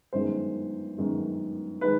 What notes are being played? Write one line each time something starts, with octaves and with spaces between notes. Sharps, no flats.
G1 F#2 D#3 G#3 C5
G1 F#2 D#3 G#3
D#3 G#3 B4